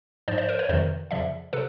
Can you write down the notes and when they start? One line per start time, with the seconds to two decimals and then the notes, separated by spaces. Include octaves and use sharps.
0.28 G#2 F3 C5 D5
0.38 C5 D5
0.49 A#4 C5
0.59 B4 C#5
0.69 F2 C3 D#3 C5 D5
1.11 F2 C#3 F3 D5 E5
1.53 C3 A4 B4